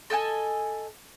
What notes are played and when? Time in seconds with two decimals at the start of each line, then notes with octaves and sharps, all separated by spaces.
0.10 A4 D#5 G5 G#5